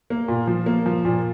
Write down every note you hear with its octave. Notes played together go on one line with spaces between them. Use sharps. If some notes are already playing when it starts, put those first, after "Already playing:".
A#3
A#2
F3
A#3
F3
A#2